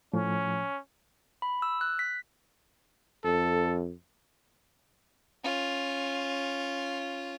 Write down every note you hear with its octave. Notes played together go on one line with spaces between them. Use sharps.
A2 F3 C#4
B5
E6
F#6
B6
F2 A4
C#4 F4